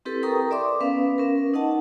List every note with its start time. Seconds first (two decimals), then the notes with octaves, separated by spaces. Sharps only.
0.05 C4 E4 G4 A4 B4
0.23 A4 A#4 G5 A#5 C#6 D#6
0.51 D5 E5 C6 D6
0.80 B3 C#4 B4 F5
1.18 C#4 A#4
1.54 D#4 D#5 F#5 A5